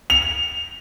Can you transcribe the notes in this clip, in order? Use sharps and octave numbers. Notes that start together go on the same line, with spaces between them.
F7